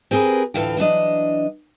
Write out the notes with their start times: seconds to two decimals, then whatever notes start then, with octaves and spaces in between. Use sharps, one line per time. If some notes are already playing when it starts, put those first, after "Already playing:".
0.11 C4 G4 G#4 A#4 B4
0.54 D2 A2 E3 F4 G5
0.77 E3 F#3 D4 D#5